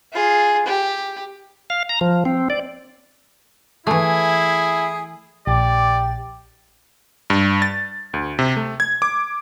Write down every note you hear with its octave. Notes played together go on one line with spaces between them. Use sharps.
F4 G#4
G4
F5
A#5
F3
C4
D5
E3 A3 E4 G#4
A#1 G4 D5 A6
G2
A6
D2
C3
A3
G#6
D6